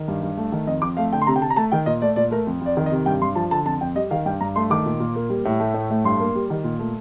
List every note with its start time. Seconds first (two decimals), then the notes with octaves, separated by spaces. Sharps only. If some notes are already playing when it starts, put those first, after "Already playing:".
Already playing: D#3
0.08 G2
0.23 G2
0.37 A3
0.52 D#3
0.67 F2 D#5
0.82 F2 D6
0.97 A3 F5
1.13 D3 G5
1.22 C6
1.27 C3 A#5
1.36 G5
1.42 C3 A5
1.50 A#5
1.56 A3 A5
1.72 D#3 G5
1.86 A#2 D#5
2.02 A3 D5
2.16 A#2 D5
2.31 A3 A#4
2.47 F2
2.61 F2 D5
2.77 D#3
2.86 D#5
2.91 C3
3.06 G2 G5
3.21 G2 C6
3.35 F3 A5
3.51 D3 A5
3.65 F2 A5
3.81 F2 G5
3.96 G3 D#5
4.11 D#3 F5
4.26 G2 G5
4.41 G2 A#5
4.56 A3 C6
4.70 D#3 D6
4.86 A#2
5.00 A#2
5.16 A#3
5.30 G3
5.45 A2
5.60 A3
5.74 A2
5.90 A3
6.05 G2 C6
6.20 A#3
6.35 G3
6.50 D#3
6.64 A#2
6.79 A3